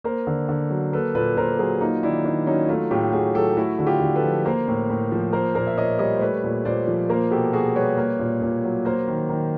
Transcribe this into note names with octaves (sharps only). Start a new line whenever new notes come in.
A#3 A#4 C5
D3
D3
F#3
A#3 A4 B4
A#2 A4 B4
A#2 A#4 C5
F#3 G#4 A#4
A#3 D#4 F4
D#3 D4 E4
D#3 D4
F#3 C#4 D#4
A3 D#4 F4
A2 F4 G4
A2 F#4 G#4
F#3 G4 A4
A3 E4 F#4
D3 F#4
F4 G4
D3
A4 B4
F3
A#3 A#4 C5
A2
A2
F3
A#3 A#4 C5
A#2 A#4 C5
E5
A#2 C#5 D#5
G3 C#5 D#5
C5
A3 B4 C#5
A#2
A#2 C5 D5
F3
A#3 A#4 C5
B2 G4 A4
B2 F#4 G#4
G3 B4 C#5
A#3
A#2
A#2
F#3
A#3 A#4 C5
D#3
D#3